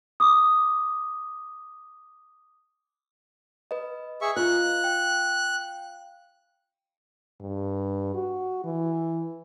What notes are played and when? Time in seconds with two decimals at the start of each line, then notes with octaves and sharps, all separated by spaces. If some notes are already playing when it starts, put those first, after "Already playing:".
0.20 D6 D#6
3.71 B4 D#5
4.21 G#4 E5 C#6
4.36 F4 A#5 F#6
4.84 G5
7.40 G2
8.15 F#4
8.64 E3